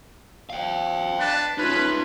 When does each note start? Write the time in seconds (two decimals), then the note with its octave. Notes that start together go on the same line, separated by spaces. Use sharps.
0.50 F5 G5
1.20 D4 B4 A5
1.58 C#4 D#4 F4 B4